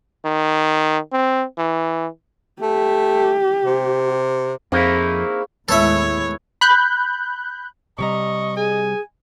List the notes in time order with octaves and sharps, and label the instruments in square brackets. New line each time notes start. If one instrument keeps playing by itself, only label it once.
[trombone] D#3
C4
E3
[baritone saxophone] A3 [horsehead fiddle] G4
[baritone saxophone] C3
[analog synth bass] F2 [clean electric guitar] A#3 D#4 E4 [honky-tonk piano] C4 F5 [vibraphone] G#4 C#6
[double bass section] D#2 A2 G#3 [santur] B3 E4 [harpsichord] A4 E5 [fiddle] C#5
[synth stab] B5 F#6 G6
[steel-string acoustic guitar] C3 G3 A#5 [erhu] D#5 [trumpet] C#6
[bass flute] G#4 [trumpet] G#5